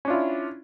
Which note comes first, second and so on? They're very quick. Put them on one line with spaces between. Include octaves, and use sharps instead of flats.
C#4 D4 F4 E4